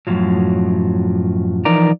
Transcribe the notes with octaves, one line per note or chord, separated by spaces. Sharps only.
F#2 A2 C#3 F3 F#3
E3 F3 D#4 A#4 D5 A#5